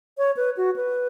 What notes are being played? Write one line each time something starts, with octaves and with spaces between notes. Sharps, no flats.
C#5
B4
F#4
B4